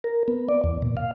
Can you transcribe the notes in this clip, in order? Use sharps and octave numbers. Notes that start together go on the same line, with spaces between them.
A#4
B3
D5
E2
A#2
F5